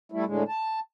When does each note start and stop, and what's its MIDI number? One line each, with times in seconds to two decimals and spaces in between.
0.12 0.25 55
0.12 0.25 57
0.12 0.25 64
0.25 0.43 45
0.25 0.43 50
0.25 0.43 56
0.48 0.80 81